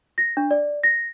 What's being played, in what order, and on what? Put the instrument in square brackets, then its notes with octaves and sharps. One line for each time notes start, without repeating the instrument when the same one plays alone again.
[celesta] A#6
D4
D5
A#6